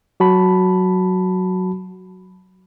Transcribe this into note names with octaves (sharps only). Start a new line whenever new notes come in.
F#3 F#4 A5 B5